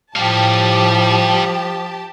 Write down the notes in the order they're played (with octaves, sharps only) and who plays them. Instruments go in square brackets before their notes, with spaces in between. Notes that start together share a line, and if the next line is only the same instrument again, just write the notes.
[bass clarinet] A2 [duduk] F3 [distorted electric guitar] G3 F5 [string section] G4 A5